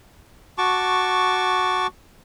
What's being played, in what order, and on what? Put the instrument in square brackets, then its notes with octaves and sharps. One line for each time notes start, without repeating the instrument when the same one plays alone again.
[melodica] F#4 A5 C#6 D6